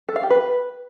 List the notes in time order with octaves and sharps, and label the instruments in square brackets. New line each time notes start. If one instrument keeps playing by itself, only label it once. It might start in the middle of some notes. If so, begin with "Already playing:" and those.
[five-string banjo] A4
F5
G4
B4